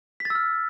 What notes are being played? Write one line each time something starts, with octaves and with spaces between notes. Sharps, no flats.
B6
A6
E6
F6